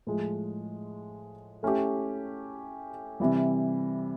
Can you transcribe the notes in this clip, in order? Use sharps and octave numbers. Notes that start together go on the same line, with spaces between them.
A2 F3 G#3
A3 C#4 E4 G4
C3 E3 G3